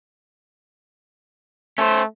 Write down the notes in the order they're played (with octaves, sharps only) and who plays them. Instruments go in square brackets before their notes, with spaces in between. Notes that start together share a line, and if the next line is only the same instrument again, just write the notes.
[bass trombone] A3 [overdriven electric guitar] C#4 C5